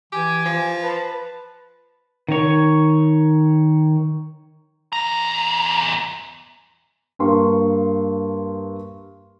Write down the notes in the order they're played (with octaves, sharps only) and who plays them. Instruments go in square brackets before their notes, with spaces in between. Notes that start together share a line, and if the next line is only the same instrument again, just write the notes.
[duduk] E3 [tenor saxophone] G4 [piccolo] G#5
[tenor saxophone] F3
[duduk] B4 [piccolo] A5
[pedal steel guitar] D#3 C#5
[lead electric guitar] E2 A#5
[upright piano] G2 A#3 C6 C#6